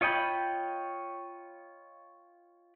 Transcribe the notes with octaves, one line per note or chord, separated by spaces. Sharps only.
F4 C#5 D#5 G5 B5